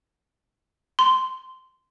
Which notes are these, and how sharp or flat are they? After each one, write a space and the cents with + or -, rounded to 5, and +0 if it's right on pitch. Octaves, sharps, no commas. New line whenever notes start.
C6 -10